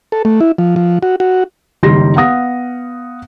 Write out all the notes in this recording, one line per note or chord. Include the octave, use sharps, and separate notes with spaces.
A4
A3
E4
F3
F3
F#4
F#4
F#1 D#3 G3 C6 A#6
B3 F5 F#5 D#6 A#6